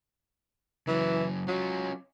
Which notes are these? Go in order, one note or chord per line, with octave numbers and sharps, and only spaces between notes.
C#3 E3 F#3
F#3 C#4 F4